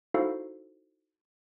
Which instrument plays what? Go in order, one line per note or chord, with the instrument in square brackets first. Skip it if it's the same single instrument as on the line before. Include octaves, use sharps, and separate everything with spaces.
[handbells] D#4 E4 F#4 A4 C5 F5